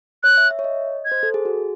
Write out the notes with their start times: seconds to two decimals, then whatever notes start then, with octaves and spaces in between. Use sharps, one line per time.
0.23 C#5 F#6
0.37 E5
0.51 E5
0.59 C#5
0.64 D#5
1.05 G#6
1.12 C5
1.23 A4
1.34 G#4
1.45 F#4